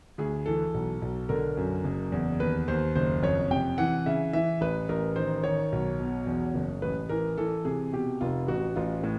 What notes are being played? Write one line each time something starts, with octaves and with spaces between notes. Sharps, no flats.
D2 G#4
E3 A4
B1
B1
D3 A#4
F#2
F#1
E2
D#2 B4
D#2 C5
F#1 C5
F2 C#5
C3 G5
E3 F#5
C#3 E5
E3 E5
A1 B4
A1 A#4
D#3 C5
D#3 C#5
B1
B2
E2
F#1
A1 B4
E3 A#4
E3 A4
C3 G#4
B2 G4
F1 F4
A1 F#4
A1 F4
A2